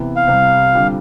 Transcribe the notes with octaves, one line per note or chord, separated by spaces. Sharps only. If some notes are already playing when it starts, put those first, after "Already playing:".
Already playing: C3 E3 B3 E4
F5
C2 C3 G3 C4
D3 G3 C4 F4